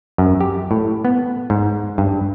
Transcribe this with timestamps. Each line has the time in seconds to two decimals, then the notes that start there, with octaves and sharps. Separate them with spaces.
0.18 F#2
0.41 G4
0.71 A2
1.05 B3
1.50 G#2
1.98 G2